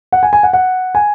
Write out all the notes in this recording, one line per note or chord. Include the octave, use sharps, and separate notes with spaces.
F#5
G#5
G#5
F#5
F#5
G#5